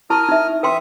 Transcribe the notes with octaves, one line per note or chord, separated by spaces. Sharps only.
E4 A#4 A5 C#6 D#6 F6
D#4 E5
B4 E5 G5 C6 D#6